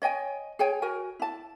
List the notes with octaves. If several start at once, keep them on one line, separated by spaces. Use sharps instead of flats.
C#5 D#5 G5 G#5
G#4 C#5 G5 G#5
F#4 A#4 G#5
E4 A5